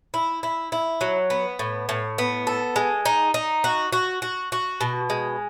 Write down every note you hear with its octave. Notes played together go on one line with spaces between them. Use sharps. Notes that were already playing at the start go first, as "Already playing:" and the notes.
E4
E4
E4
F#3
B3
A2
A2
B3
A4
G#3
D#4
D#4
F#4
F#4
F#4
F#4
B2
G#3